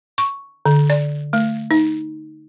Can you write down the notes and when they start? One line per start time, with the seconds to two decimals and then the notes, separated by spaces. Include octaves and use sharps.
0.18 C#6
0.66 D3
0.90 D5
1.33 A3
1.71 D#4